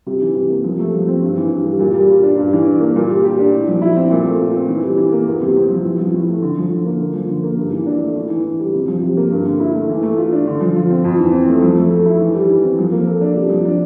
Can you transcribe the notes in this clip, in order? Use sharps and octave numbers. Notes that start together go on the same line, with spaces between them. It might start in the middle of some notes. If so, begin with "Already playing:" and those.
C3
E3
C3
A#3
F3
A3
F3
C4
G2
E3
G2
G3
A#2
G3
F4
D4
G2
E3
D4
A#3
A#2
G3
G4
D4
A2
F3
E4
C4
A#2
A3
F4
C4
E3
G3
E3
A#3
E2
C3
C4
F3
A2
F3
A2
A3
D3
F3
D3
A#3
D3
F3
D3
A#3
G2
E3
D4
A3
A2
E3
A2
G3
C3
F3
C3
A#3
G2
D3
E4
A3
E3
A3
F4
D4
D3
F3
F4
C4
F2
E3
C4
A3
F3
A3
A4
E4
E3
G3
E3
C4
F3
A#3
A4
D4
C3
F3
D4